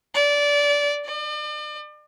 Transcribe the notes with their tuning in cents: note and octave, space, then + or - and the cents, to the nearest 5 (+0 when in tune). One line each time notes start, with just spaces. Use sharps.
D5 -20
D5 +40